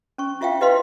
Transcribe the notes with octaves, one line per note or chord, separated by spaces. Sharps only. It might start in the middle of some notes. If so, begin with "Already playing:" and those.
C#4 C#6
E4 F4 E5 F5 G5
E4 G4 B4 D#5 F5 C6